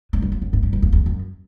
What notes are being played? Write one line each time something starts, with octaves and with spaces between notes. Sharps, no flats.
G2
F#2
F2
F#2
G#2
G2
F#2
F2
E2
F#2